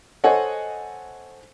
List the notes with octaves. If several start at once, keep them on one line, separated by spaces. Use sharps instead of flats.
A4 C5 C#5 D#5 F#5 G#5